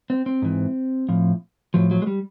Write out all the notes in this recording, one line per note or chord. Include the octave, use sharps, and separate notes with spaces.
C4
C4
G#2 E3
A2 F3
A2 F3 F#3
F#3
G#3
G3